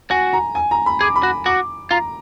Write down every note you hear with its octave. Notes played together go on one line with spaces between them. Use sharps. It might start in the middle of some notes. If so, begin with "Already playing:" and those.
F#4 G#5
A#5
G#5
A#5
B5
G#4 D6
B5
F#4
F#4 D6
F4 A#5